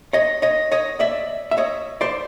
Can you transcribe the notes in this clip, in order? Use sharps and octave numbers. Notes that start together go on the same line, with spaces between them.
C#5 D#5
C#5 D#5
C#5 D#5
D5 E5
E5
C#5 D#5
C5 D5